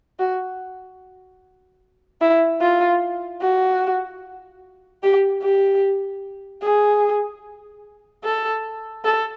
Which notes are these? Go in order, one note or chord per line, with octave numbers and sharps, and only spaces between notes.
F#4
E4
F4
F#4
G4
G4
G#4
A4
A4